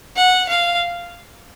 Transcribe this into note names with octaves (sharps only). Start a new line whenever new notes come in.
F#5
F5